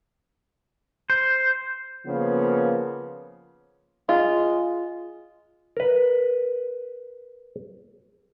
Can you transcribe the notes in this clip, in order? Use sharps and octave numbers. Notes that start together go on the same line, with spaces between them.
C5
C#3 F3 A#3 B3
G#3 F4
A#4 B4